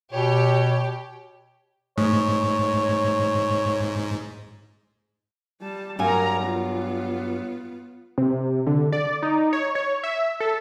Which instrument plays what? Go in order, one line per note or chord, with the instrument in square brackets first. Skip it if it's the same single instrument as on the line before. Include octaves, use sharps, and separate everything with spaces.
[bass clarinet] B2 [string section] G4 [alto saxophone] C#5
[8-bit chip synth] G#2 [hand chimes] A3 [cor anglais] C#5
[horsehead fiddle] G3 A5
[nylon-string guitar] G2 F#3 G#5 [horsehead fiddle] A#4 A#5
[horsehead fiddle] B3 F4
[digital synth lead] C3
D3
D5
D#4
C#5
C#5
E5
A4